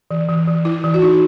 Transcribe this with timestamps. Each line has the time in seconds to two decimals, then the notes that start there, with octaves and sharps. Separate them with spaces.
0.11 E3
0.29 E3
0.47 E3
0.65 E4
0.84 E3
0.94 F#4
1.02 D#4 E4